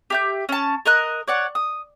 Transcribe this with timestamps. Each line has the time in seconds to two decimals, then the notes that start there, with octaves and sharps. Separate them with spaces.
0.10 G4 E5 G6
0.49 C#4 A5
0.86 A#4 D#5 F#6
1.28 C#5 D5 F#5
1.55 D#6